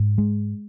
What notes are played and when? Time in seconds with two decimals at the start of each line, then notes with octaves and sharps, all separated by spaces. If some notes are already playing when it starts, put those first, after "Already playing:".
Already playing: G#2
0.18 G#3